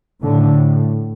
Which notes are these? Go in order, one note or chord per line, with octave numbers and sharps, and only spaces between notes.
A2 D3